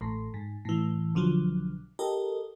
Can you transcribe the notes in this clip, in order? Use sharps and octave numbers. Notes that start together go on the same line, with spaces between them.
A1 A2
G#2
A2 E3
B1 D3 F3 F#3
G4 A4 A#4 D#5